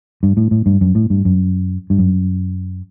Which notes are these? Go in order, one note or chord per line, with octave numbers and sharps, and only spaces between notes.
G2
A2
A2
G2
F#2
A2
G2
F#2
G2
F#2